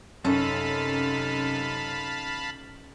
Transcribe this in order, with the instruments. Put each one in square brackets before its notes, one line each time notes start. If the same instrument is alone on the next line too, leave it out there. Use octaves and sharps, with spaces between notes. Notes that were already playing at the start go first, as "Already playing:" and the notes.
[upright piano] F#2 [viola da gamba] C3 D#4 [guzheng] C#4 A4 [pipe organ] F5 A5 B5